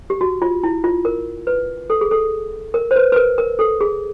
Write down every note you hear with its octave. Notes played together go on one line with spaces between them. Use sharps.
G4
F#4
F4
E4
F4
A#4
B4
A4
G#4
A4
A#4
C5
B4
B4
A#4
A#4
A4
G#4